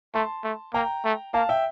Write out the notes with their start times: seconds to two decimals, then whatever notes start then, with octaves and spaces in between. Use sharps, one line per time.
0.14 A3 A5 C6
0.44 A3
0.74 A#3 G5 A#5
1.04 A3
1.34 A#3 F5 A5
1.49 E5 G5